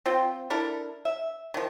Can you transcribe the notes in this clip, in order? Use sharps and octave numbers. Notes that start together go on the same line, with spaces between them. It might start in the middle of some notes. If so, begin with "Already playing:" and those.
C4 F4 G5
D4 E4 A4 A#4
E5
D#3 F3